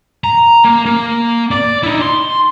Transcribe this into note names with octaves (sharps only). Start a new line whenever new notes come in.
A#5
A#3
A#3
D5
D#4 E4
C6